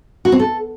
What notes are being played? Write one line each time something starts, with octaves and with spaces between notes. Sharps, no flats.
F#4
C4
A4